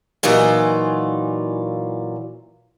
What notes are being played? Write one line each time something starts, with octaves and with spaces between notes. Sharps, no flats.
A#2 E3 F#3 D#4 F4